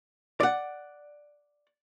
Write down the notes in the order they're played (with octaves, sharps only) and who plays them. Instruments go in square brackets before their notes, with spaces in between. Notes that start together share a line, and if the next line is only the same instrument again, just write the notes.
[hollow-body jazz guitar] D5 F#5